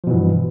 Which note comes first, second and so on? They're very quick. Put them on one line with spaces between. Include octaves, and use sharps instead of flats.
F3 B2 E3 G2